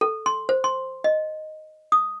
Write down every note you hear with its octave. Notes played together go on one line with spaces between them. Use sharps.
A4
C6
C5
C6
D#5
D#6